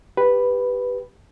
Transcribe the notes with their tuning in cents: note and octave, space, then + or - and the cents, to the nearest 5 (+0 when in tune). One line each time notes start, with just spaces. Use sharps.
G4 +5 B4 +0